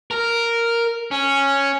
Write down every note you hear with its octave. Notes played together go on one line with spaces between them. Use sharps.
A#4
C#4